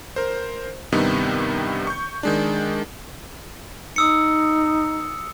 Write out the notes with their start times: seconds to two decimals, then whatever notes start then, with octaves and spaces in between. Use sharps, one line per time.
0.16 A#4 C5
0.92 G2 C3 D#3 G3 B3 D#4
1.87 C#6 G6
2.23 D#3 G#3 D4
3.96 D#4 D#6 E6 C#7